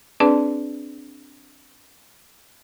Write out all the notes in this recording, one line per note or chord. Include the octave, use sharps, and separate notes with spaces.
C4 D4 G#4 B4 D5 A5